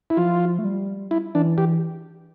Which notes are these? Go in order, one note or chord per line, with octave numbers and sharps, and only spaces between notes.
E4
F3 F4
A3
G3
E4
E3 D4
E3 G4